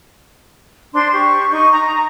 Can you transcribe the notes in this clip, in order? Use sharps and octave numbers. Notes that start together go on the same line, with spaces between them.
D4 C5 C6
G4 C#6
D#4 D#5 C#6
A#5